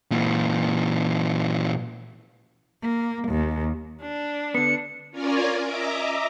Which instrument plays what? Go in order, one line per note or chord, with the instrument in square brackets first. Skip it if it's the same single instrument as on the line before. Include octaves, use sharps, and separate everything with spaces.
[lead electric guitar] A#2 E3
[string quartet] A#3
D#2
[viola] D4
[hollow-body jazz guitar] D3 B3 [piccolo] C#7
[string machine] C#4 F4 A#4 C#5 D5 G#5
D#5 E5 A#5 D6